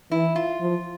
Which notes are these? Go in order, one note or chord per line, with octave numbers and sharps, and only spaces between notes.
E3 E4
F4
F3